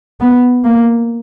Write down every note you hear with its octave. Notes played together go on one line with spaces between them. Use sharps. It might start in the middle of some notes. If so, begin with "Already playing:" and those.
B3
A#3